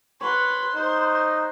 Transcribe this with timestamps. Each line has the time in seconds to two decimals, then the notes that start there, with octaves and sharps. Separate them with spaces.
0.21 B4 C#5 F#5 A#5 C6
0.75 D#4 C5